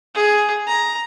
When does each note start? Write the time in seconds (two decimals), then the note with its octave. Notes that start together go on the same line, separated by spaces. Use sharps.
0.15 G#4
0.67 A#5